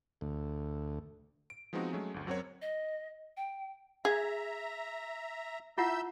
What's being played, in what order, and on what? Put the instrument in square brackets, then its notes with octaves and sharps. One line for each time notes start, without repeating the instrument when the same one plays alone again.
[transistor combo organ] D2
[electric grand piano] D7
F3 G#3 B3 C4 D#4 F#4
F#3 G#3 A3 C#4
G1 D2
F#2 F#3 C4 F#4 A#4 C#5
[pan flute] D#5
G5
[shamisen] G#4 [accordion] E5 A#5
[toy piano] E4 F4 F#5 [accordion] E5 E6 G6